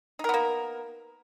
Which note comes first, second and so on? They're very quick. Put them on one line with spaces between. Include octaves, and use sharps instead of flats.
D#4 A#4 B3 A#3